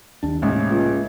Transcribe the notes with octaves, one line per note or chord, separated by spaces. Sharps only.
D#2 D4
A1 C3 G#3 A#3
C#2